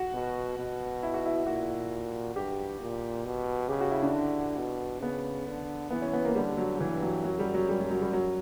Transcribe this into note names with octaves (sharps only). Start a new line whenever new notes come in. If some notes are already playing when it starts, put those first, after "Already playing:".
Already playing: F#4
B2
B2
E4
F#4
E4
A#2 F#4
G2 G4
A#2
B2
C#3 G4
F#4
E4
D4
D3
B2
C#3 B3
D3
E3 B3
C#4
B3
A#3
D3 G3
F#3
G2 E3
F#3
F#2 F#3
G3
F#3
G3
F#3
F#3
G3
F#3